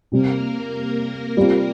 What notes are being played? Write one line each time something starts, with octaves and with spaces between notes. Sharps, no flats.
C3 G3 A#3 C4 A#4
G3 C4 F4